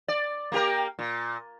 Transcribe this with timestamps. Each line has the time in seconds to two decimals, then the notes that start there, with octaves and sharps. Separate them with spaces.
0.08 D5
0.52 A#3 G4 A#4
0.99 A#2